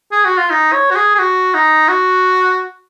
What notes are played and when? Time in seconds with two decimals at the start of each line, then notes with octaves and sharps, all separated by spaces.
0.12 G#4
0.25 F#4
0.38 F4
0.50 D#4
0.73 C#5
0.91 F#4
0.96 G#4
1.15 G#4
1.19 F#4
1.54 D#4
1.89 F#4